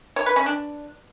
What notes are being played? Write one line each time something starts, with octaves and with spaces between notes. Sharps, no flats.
C#5
B4
C#4
D4